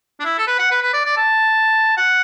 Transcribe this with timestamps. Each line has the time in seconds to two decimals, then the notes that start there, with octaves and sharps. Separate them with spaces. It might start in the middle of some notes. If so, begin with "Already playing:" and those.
0.20 D4
0.25 E4
0.39 A4
0.47 B4
0.59 F#5
0.71 B4
0.83 B4
0.94 D5
1.05 D5
1.17 A5
1.97 F#5